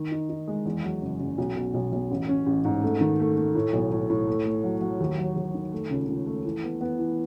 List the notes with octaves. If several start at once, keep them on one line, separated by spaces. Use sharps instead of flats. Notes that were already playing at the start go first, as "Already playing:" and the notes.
Already playing: D#3
D#4
D#4
G#3
E2
F#3
F#1
F#1
B1
B2
B1
B1
A1
C#4
A1
G#2
A3
D#3
A3
A3
A2
B1
A2
A2
A3
A3
F#3
F#3
D#2
F#3
D#2
D#3
A3
C#2
C#2
A3
E3
B3
B3
E3